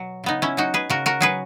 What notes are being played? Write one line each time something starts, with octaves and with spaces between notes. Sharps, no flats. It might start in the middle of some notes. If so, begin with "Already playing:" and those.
Already playing: B2 F#3
C#3 B3 D#4
C#4 E4
F#3 D#4 F#4
G#4 B4
C#3 F#4 A#4
F#4 A#4
F#3 G#4 B4